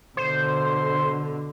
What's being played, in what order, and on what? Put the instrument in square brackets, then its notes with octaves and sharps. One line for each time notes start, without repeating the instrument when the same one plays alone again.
[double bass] B2 D3 [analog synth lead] C5